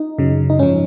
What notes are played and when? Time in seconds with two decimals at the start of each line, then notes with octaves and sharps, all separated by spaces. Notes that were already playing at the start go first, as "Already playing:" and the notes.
Already playing: D#4
0.18 F#2 C#3 F#3
0.50 D#4
0.59 G#2 F3 C#4